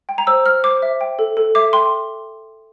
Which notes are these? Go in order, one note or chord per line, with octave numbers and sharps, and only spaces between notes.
G5
A#5
C5 E6
C5 F6
C5 D6
E5
G5
A4
A4
E5 D6
G5 C6